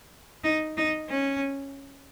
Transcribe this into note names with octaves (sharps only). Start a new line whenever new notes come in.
D#4
D#4
C#4